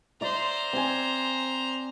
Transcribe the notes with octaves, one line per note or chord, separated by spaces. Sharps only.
C5 D5 E5 A#5
C4 G#5